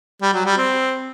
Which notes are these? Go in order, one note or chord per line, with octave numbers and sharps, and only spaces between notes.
G3
F#3
G3
C4